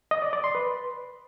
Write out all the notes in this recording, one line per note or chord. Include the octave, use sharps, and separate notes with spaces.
D#5
D5
D5
C6
B4